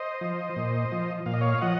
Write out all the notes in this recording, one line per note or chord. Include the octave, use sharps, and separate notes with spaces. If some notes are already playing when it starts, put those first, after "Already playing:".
Already playing: C5 D#5
F3
A#2
F3
A#2 F5
D#5
C#5 F5
F3 D#5 F#5